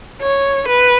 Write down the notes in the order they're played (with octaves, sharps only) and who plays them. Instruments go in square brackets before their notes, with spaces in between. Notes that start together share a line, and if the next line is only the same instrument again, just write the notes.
[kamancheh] C#5
B4